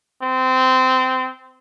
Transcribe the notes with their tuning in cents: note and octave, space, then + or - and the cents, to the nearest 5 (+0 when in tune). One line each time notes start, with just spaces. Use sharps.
C4 -20